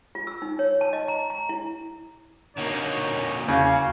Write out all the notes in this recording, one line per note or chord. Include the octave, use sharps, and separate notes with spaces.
F4
E6
D#4
C#5
A5
D#5
A#5
A#5
E4
D3 A#3 D#4 F#4 C#5
E2 C#3 A#3 F#4